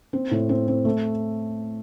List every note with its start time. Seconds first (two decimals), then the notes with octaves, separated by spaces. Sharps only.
0.13 C4
0.31 A2
0.49 C4
0.68 C4
0.85 A3